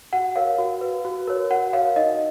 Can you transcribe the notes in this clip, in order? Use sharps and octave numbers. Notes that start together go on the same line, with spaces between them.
F#4 F#5
A#4 C#5 F5
F#4
B4
F#4
A#4 C#5
F#4 F#5
A#4 C#5 F5
D#4 D#5